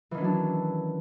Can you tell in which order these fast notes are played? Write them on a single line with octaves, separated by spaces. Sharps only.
E3 D#3 C#4 F#3 D4